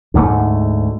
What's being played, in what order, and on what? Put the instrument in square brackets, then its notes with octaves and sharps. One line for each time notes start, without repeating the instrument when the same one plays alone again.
[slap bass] D2 G#2 A3